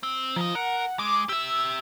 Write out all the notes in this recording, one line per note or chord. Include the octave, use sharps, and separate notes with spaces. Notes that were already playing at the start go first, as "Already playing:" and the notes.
C4
D#3 F3 D#5
A#4 F#5
G#3 D6
G4 E5 E6